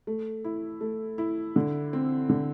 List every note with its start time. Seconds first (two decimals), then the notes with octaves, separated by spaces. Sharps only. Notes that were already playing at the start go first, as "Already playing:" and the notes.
0.07 A3
0.44 E4
0.81 A3
1.18 E4
1.56 D3
1.93 C4
2.29 D3